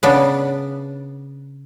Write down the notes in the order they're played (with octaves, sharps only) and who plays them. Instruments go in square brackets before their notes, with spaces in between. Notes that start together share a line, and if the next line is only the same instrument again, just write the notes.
[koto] C#3 B3 D4